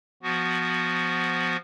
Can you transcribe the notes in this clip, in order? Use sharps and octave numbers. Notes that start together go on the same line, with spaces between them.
F3 B3 F#4